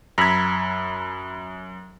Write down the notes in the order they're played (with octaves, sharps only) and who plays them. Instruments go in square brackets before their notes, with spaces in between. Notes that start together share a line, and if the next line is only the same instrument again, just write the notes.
[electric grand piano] F#2 G#6 [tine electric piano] A#5 B5 E6